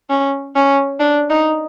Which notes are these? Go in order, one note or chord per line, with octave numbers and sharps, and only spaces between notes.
C#4
C#4
D4
D#4